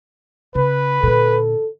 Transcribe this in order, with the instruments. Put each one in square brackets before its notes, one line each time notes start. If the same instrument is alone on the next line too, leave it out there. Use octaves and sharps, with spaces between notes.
[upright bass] C#3 [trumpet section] B4
[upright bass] A#2 D3 [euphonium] A4